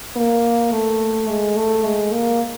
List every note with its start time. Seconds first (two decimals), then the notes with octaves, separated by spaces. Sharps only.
0.16 A#3
0.72 A3
1.28 G#3
1.57 A3
1.84 G#3
2.12 A#3